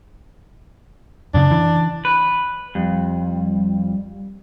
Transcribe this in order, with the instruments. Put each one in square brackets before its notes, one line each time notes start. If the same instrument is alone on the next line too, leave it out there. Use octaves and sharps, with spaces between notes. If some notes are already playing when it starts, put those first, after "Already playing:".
[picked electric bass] F#2 C#3 [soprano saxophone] D4
[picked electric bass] E3
[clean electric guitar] B4
[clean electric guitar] F2 [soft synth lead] G3